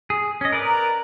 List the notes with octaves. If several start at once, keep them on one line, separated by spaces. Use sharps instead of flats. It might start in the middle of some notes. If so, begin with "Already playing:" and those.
G#4
C#4 D#5
A#4 B4 D5
A#5